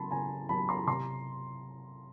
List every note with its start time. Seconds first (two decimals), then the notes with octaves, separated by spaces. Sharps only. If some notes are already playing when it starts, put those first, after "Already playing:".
Already playing: C#3 F#3 A5 B5 C6
0.11 C#3 G#5 A#5
0.49 F#3 A5 B5
0.69 A#5 C6
0.87 C3 A#5 C6